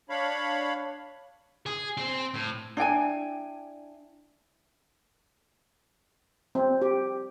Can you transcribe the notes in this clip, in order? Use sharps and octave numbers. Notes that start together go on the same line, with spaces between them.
D4 C#5 F5 B5
G#4
C4 C5
A2
D4 E4 G5 G#5
C4
G4